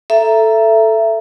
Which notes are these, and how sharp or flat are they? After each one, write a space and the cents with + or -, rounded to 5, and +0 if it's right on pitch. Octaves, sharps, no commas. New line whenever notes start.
A4 +0 E5 +20 A#5 +0